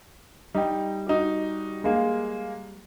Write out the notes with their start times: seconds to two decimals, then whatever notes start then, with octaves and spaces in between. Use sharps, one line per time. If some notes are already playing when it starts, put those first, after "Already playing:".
0.55 G3 D#4 G5
1.07 D#4 F#4 G4
1.84 G#3 A#3